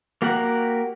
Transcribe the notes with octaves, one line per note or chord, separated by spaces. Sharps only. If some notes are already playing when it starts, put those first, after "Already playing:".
A#3 F#4 G4 A#4 F#5